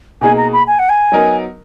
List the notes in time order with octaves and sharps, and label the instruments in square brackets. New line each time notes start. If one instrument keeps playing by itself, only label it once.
[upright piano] B2 A#3 D#4 G#4 [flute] G#5
[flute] A#5
B5
G#5
F#5
G#5
[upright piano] F#3 B3 D#4 A#4